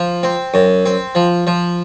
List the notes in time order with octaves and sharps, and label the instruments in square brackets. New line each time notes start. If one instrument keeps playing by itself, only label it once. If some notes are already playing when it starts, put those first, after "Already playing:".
Already playing: [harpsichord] F3
C4
F#2
C4
F3
F3